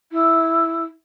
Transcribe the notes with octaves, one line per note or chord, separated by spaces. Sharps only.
E4